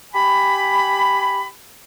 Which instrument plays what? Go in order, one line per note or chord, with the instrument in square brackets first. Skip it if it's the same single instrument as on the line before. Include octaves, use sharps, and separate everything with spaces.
[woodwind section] G4 G#5 B5